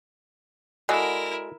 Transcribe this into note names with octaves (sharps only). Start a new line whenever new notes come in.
G#3 E4 F#4 A4 A#4 D5